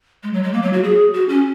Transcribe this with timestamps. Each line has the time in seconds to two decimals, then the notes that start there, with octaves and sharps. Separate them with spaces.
0.23 G#3
0.33 F#3
0.43 G#3
0.53 A#3
0.63 F#3
0.73 F#4
0.83 G#4
1.14 F#4
1.29 C#4